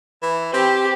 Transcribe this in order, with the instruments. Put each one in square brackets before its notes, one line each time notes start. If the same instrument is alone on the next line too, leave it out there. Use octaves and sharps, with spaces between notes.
[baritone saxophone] E3
[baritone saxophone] C4 [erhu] G4